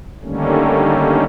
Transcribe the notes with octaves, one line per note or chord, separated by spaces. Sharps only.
D3 D#3 G3 A3 A#3 C#4